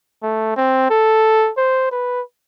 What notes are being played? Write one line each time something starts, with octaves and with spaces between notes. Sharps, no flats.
A3
C4
A4
C5
B4